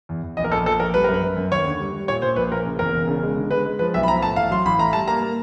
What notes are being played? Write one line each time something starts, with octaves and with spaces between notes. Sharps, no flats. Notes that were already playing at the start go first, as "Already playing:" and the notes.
E2
E2
A#1 D#5
A#4
A#1 A4
F3 A4
A#1 A#4
G3 B4
F#2 A#4
B4
F#2
F#2
D#2 C#5
D3
G3
G3
A#2 C#5
A#2 C5
A#1 B4
A#1 A#4
C#3
E2 A#4
E1
C#3
G#3
D3
G#3 B4
G#3
F3 B4
B1 E5
B5
F3 A#5
A2 A5
A1 F5
F#3 C6
A1 B5
A2 A#5
G3 A5
A#3 A#5
A#3